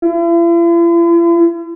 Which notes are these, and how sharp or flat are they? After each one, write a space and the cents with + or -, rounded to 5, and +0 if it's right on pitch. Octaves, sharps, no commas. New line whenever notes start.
E4 +45